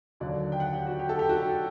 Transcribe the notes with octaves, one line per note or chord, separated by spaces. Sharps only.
D#2 D3 F#3 D5
G5
F#5
G4
F#4
G4
A4
G4
F#4
G4